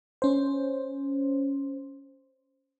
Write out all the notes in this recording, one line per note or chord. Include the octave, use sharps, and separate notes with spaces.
C#4 C5